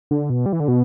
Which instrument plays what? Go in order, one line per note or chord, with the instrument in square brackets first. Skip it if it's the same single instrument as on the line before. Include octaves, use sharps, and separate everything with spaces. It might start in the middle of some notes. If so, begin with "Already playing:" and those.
[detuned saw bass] D3
B2
G3
E3
D3
B2